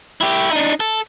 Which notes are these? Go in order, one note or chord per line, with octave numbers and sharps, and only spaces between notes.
E4 G4
D4 D#4
A4